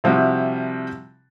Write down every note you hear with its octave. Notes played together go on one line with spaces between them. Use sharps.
C3 F3 G3 E4 F#4